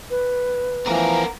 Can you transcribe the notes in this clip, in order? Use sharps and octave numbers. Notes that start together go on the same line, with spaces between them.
B4
E3 F3 B3 A#4